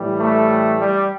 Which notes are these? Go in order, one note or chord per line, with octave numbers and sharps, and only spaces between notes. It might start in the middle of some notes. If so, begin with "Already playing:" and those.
Already playing: A2 E3 G3
A3
G3